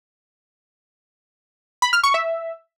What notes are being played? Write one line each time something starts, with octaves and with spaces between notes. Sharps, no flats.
B5
F6
C#6
E5